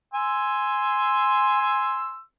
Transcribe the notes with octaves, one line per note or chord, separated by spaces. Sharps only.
G#5 C6 E6